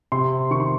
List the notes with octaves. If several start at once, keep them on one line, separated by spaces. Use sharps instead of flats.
C3 C6
D#3 C#6
C6